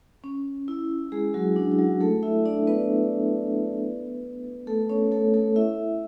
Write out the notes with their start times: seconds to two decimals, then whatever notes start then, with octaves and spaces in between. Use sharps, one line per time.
0.24 C#4
0.68 E4
1.12 G#3 G#4
1.34 F#3 F#4
1.56 D4
1.72 E4
1.79 F#3 F#4
2.01 A3 A4
2.23 E4 E5
2.45 D4 D5
2.67 B3 B4
4.67 A3 A4
4.90 C#4 C#5
5.11 A3 A4
5.34 A3 A4
5.56 E4 E5